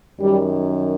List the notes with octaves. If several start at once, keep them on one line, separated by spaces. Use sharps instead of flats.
F#2 D#3 G3